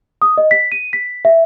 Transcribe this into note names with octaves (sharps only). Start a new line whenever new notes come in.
D#6
D#5
B6
D#7
B6
E5